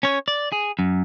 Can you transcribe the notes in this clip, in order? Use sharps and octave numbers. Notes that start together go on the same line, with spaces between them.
C#4 C#5
D5
G#4
F#2